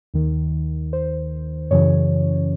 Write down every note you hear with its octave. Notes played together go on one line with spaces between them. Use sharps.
D#2 D#3
C5
F#2 C#3 E3 C#5